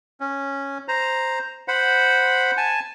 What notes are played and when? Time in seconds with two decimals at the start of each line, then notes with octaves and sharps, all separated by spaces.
0.20 C#4
0.88 C5 A#5
1.68 C5 F#5 B5
2.57 G#5 A5